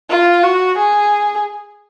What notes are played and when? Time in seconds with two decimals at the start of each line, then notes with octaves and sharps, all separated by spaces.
0.10 F4
0.43 F#4
0.77 G#4